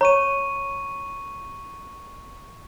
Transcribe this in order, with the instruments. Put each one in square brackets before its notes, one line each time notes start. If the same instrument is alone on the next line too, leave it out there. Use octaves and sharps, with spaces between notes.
[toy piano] C#5 [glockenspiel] A#5 C#6 D#7